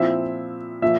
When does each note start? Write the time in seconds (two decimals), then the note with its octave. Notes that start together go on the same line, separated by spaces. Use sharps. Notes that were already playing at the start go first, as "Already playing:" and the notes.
Already playing: A#2 F3 C4 E4 E5
0.82 A#2 F3 E5